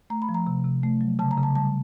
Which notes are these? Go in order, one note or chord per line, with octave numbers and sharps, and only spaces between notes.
A3 A#5
B5
F3
A#5
C3
C3
A3
F#3
C#3 A5
A#5
C#3
A5
G3 A5